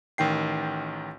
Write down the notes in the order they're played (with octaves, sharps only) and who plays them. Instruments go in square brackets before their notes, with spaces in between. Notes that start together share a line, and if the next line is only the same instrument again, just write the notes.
[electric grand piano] A1 D#3 G5 C7